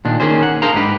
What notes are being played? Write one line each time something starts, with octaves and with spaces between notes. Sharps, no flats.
A#2 D#3 D4
D#3 A#3 C#4 G#4 C5
F#5
D4 G#4 A#4 C5 F5 A#5
G#2 G4 B4